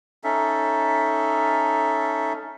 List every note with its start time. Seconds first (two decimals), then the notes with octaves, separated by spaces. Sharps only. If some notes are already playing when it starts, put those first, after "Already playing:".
0.24 C#4 D#4 A4 E5